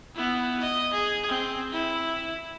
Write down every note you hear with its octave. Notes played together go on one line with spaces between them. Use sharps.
B3 E4
D#5
G#4
C4
E4